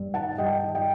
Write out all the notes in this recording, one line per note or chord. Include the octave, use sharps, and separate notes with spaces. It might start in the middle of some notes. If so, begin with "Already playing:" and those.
Already playing: G2
D#3 F#5 A5
G2 D#5 G5
D#3
D#5 G5